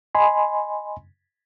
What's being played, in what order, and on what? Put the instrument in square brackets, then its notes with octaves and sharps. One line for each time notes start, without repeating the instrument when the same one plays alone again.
[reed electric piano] D#5 G#5 B5 C6